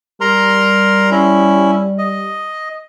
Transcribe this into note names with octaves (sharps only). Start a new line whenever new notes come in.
G3 A#4 A#5 C6
C#4 E4
D#5